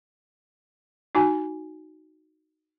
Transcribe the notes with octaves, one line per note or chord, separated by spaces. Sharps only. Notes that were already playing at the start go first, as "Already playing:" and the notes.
D#4 F#4 G#5